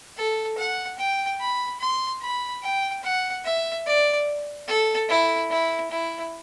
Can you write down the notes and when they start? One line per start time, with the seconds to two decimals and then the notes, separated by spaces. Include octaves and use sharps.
0.17 A4
0.58 F#5
0.98 G5
1.40 B5
1.80 C6
2.22 B5
2.63 G5
3.03 F#5
3.44 E5
3.86 D5
4.68 A4
5.09 E4
5.50 E4
5.91 E4